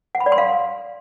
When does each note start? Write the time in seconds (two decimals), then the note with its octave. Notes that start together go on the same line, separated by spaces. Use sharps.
0.15 F#5
0.20 B5
0.26 D5
0.32 C6
0.38 F5